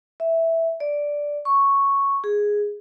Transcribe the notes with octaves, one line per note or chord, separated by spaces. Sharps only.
E5
D5
C#6
G#4